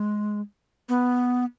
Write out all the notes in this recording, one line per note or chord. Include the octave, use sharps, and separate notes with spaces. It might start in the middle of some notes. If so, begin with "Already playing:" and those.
Already playing: G#3
B3